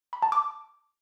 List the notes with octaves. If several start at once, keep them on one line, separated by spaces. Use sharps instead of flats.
B5
A5
D6